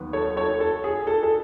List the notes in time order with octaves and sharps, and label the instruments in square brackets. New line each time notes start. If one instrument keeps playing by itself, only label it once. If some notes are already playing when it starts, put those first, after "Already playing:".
Already playing: [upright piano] D#2 D#3 F#3 B3
A4 C#5
A4 C#5
A4
G#4
A4
A4